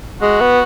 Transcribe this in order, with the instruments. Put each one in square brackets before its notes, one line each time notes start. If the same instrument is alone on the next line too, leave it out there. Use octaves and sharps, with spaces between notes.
[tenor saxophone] G#3 [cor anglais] F#4
[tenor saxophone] B3